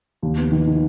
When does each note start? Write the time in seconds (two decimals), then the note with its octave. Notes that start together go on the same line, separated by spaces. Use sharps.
0.22 D#2
0.37 B3
0.52 D#3
0.67 D#3